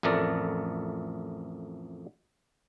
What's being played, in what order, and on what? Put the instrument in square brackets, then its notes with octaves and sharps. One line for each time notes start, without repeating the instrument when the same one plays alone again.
[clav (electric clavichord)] A1 F2 A3 A#4 D5